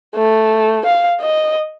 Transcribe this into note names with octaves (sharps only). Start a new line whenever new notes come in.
A3
F5
D#5